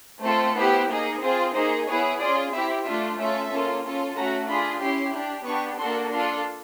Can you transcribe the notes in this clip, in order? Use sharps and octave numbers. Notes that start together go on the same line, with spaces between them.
A3 C4 F4 A4 C5
B3 E4 G4 C5
A#3 D#4 G#4
C4 F4 G#4 C5
A#3 D#4 G#4 C5
B3 E4 G#4 C#5
C#4 F4 G#4 D5
C4 E4 G4 E5
A3 D4 F4 E5
A3 C#4 F4 A4 E5
A#3 C#4 F4 A4
C#4 F4 A4
A3 C#4 F#4 A#5
D4 F4 G#4 B5
C#4 E4 G4 C6
D4 G4
B3 D4 G4 C#6
A#3 D4 F#4 A4 C6
D4 F4 A4 C6